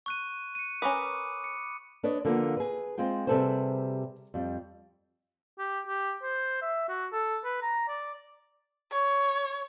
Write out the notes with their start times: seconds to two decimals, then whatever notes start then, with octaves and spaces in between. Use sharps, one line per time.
0.06 C#6 F#6 D#7
0.55 C#7 D#7
0.82 C#4 A#4 B4 B5 D6 D#6
1.44 C#7
2.03 D4 B4 C#5 D#5
2.25 D3 F3 A#3 B3
2.57 G#4 B4
2.98 G#3 C4 F4 G5
3.27 C3 G3 G#4 A4 B4 C5
4.34 F2 G3
5.59 G4
5.87 G4
6.23 C5
6.62 E5
6.89 F#4
7.12 A4
7.44 B4
7.62 A#5
7.88 D5
8.92 C#5